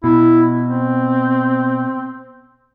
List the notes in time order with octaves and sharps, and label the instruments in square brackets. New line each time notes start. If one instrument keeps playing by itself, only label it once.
[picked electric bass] B2 [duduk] E4
[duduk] C4